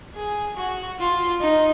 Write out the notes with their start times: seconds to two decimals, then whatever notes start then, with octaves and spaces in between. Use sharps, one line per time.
0.15 G#4
0.56 F#4
0.99 F4
1.41 D#4